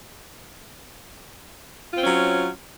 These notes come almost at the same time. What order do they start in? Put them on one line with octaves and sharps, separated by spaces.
F4 C4 C#4 F#3